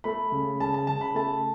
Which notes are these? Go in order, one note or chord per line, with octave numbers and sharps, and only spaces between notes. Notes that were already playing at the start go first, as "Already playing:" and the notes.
A3 B5
C#3
C#3 A5
A5
C#3 A5
B5
A3 A5